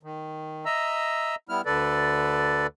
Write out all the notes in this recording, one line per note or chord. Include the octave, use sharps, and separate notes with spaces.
D#3
D#5 E5 A#5 E6
G3 B3 E4 F6
D2 D3 A4 B4 D5